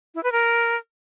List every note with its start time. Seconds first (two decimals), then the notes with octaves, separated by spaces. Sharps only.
0.15 E4
0.23 B4
0.32 A#4